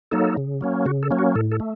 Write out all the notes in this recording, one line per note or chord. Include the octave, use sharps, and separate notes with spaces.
F#3 A#3 D#4 A4
C#3
F#3 A#3 C#4
C#3 F#4
A4
F#3 A#3 C#4
F#4
A2 A4
A4
A3